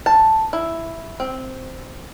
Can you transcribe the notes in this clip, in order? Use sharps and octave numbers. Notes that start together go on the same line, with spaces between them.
A5
E4
C4